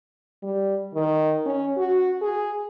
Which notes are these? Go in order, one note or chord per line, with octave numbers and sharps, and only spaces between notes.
G3
D#3
C#4
F#4
G#4